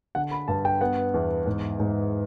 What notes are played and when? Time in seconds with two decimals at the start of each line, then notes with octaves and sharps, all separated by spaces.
0.15 D3 F#5
0.31 B5
0.48 G2 A5
0.65 G5
0.81 B3 F#5
1.14 E2
1.46 G#2
1.80 G#2